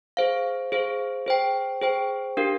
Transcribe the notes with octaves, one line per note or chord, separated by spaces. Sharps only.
G#4 C5 F5
G#4 C5 F5
G#4 C5 G5
G#4 C5 G5
D4 G4 A#4 F5